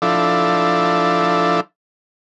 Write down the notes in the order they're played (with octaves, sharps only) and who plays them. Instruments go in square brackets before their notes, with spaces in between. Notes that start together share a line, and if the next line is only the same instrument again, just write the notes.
[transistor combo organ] F3 D4 E4 A4